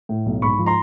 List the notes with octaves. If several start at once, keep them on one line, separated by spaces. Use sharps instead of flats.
A2
B1
G#2 B5 C#6
F3
A#5 C6